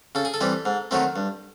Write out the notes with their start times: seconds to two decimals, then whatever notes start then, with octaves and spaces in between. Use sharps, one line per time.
0.15 C#3 A4
0.25 G#4
0.34 A4
0.41 E3 G3 C4
0.65 G#2
0.91 D#3 F#3 A3 C4
1.16 G2